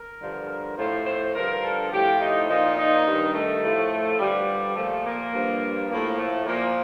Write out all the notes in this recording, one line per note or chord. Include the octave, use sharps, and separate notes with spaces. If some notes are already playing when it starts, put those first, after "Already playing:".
Already playing: A#4
G2 D3 F3
A#4
A2 F3 C5
C5
G2 D3 F3 A#4
A4
A2 F3 G4
D#4
A#2 F3 D#4
D#4
G2 D#3
A3
A2 F3
G2 D3 F3 G3
A#2 F3 A3
A#3
G2 F3
A2 F3 A#3
A3
A#2 F3 A#3